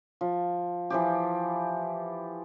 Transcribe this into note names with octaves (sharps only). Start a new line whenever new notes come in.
F3
E3 F3 G4